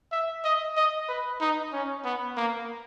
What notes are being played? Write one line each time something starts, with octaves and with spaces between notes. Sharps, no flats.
E5
D#5
D#5
B4
D#4
C#4
B3
A#3